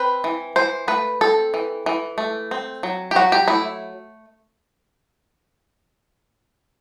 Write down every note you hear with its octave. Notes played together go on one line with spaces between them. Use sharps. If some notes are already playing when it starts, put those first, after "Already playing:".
Already playing: C4 B4
E3
E3 C5
A3 B4
C4 A4
E3
E3
A3
C4
F#3
G4
F#3 F#4
G4
A3 E4